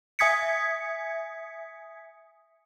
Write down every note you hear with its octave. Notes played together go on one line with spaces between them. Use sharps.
E5 G#5 D#6 G#6 B6 C#7